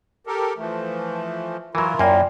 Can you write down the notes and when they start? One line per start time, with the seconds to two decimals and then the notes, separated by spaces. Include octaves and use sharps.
0.27 G4 A4 A#4
0.57 E3 F3 A3
1.75 E3 F#3 E4 F4 A#4
1.99 F#2 A#3 D5 G5